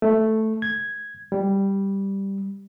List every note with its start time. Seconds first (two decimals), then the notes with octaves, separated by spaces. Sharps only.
0.02 A3
0.62 G#6
1.32 G3